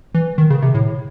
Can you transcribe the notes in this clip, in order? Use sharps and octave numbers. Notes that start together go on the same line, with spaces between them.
E3
D#3
C#3
C3
A2